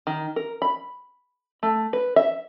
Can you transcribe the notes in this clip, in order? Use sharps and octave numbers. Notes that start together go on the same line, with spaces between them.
D#3
A#4
B5
A3
B4
E5